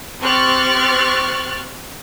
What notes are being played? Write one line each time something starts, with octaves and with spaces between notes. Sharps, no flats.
C4 G4 C#6 F6 F#6 A6